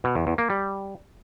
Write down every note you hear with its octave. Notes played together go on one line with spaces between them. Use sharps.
B2
E2
E2
A#3
G3